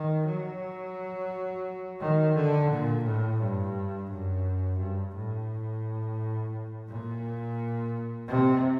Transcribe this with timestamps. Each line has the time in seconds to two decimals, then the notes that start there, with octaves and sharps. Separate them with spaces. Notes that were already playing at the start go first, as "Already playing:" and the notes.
Already playing: D#3
0.26 F#3
2.00 D#3
2.35 D3
2.70 A#2
3.04 A2
3.40 G2
4.10 F#2
4.79 G2
5.15 A2
6.88 A#2
8.28 C3